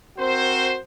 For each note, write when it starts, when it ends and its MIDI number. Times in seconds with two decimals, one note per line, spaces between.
0.18 0.78 60
0.18 0.78 66
0.18 0.78 70
0.18 0.78 72